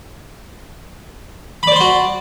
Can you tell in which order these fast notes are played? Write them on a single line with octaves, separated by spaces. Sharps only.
B5 D5 C5 C6 F#4